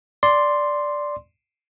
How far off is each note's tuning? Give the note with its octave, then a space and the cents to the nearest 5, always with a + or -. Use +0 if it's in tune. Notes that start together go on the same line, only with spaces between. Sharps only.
D5 +0 C6 +0